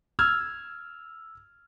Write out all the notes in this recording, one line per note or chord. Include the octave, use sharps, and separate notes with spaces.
E6 F6 G#6